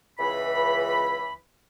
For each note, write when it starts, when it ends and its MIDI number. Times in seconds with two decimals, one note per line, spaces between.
0.19 1.33 37
0.19 1.33 52
0.19 1.33 83